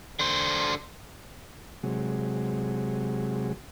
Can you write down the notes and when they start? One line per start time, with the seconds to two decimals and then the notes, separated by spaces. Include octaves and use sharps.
0.19 D3 C5
1.83 C3 F#3 G#3